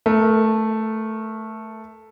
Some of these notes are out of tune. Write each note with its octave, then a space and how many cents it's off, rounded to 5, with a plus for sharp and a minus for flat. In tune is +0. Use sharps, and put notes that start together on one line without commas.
A3 +0 A#4 +20